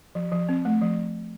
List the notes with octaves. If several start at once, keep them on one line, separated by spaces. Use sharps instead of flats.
F3
F3
C4
A3
F3